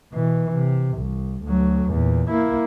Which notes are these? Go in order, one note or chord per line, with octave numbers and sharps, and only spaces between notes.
B2 E3
C3
C2
D2 F#3
E2 A#2
A#3 E4